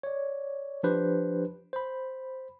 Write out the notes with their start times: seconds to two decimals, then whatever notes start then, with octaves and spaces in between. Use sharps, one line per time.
0.03 C#5 D5
0.83 F3 D4 G4 B4 C5
1.73 C5 B5